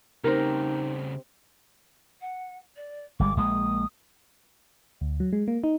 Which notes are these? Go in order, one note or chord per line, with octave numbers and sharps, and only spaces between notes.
C#3 A3 C4 D#4 G4 A#4
F#5
D5
G1 G3 G#3 D6
A#1 G#3 A#3 D#6
D2
F#3
G#3
A#3
D#4